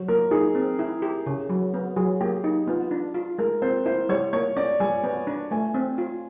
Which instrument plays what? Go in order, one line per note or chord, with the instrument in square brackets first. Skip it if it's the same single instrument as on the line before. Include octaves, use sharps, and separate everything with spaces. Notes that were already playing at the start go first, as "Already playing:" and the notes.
Already playing: [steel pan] F#3
[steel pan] A#3 [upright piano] A#4
[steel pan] D#4 [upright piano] G#4
[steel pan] C4
E4
G4
C#3
F#3
B3
[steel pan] F#3 [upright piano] G#4
[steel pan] A#3 [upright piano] G4
[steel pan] D#4
[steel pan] B3 [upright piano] F4
[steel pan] D4
F4
[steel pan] G#3 [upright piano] A#4
[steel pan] C4 [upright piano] C5
[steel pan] E4 [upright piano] C5
[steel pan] G3 [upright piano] C#5
[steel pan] A#3 [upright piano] C#5
[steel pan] C#4 [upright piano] D5
[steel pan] G3 [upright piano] G#5
[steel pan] B3
D4
[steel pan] A3 [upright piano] G#5
[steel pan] C4
F4